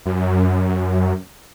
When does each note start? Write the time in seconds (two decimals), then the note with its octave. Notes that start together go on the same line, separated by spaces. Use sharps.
0.06 F#2